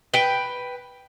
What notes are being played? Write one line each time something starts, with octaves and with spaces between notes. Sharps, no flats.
B4 G5